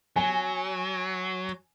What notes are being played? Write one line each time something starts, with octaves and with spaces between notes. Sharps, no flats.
F#3 G#5